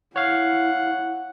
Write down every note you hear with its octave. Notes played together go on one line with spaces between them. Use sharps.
E4 C#5 F5 F#5